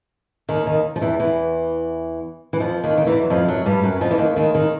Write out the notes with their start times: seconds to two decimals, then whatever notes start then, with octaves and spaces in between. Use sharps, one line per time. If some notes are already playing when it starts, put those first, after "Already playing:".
0.49 D#2 D#3
0.66 D#2 D#3
0.96 F3
1.01 E2 E3
1.20 E2 E3
2.53 E3
2.60 F2 F3
2.84 D#2 D#3
2.98 D#3
3.07 E2 E3
3.23 F#3
3.30 F2 F3
3.48 F#2 F#3
3.66 G2 G3
3.83 F#2 F#3
4.01 F2 F3
4.11 E3
4.18 D#2 D#3
4.36 D#2 D#3
4.54 D#2 D#3